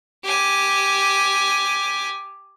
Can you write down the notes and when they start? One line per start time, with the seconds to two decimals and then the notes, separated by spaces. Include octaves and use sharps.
0.24 G4 G#5